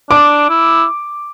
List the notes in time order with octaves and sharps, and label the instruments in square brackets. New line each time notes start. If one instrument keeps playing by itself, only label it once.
[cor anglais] D4 [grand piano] D6
[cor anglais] E4